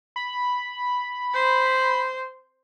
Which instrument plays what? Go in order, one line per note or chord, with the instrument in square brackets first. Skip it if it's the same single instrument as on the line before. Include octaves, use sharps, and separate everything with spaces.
[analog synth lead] B5
[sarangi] C5